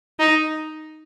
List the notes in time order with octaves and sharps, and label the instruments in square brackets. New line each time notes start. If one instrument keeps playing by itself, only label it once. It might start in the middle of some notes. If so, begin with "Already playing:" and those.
[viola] D#4